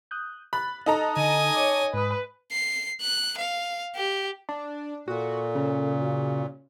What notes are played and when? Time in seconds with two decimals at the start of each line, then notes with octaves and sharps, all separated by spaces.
0.11 D#6 F#6 G6
0.53 B5 F#6 A6
0.86 D#4 A4 A#5
1.17 D3 D#5 G#5
1.55 C#5 D6
1.94 G#2 B4 D#6
2.51 C7
3.01 F#6
3.37 F5
3.96 G4
4.49 D4
5.08 A#2 F#4 A4
5.55 C#3
5.99 F#4